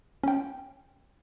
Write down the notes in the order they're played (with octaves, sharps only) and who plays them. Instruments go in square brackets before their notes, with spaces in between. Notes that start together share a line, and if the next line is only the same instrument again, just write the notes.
[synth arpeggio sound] C#4 G5